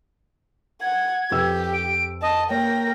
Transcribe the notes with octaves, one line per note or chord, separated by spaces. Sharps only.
F#5 G#6
F2 G4 B4 E6
D7
D#5 A5
A#3 A#4 C#5 G5 A#6